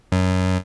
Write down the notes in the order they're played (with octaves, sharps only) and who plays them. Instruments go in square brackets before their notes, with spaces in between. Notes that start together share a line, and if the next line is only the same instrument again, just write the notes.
[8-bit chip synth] F#2